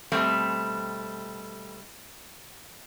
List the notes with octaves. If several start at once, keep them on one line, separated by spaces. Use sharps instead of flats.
B2 G3 A3 C4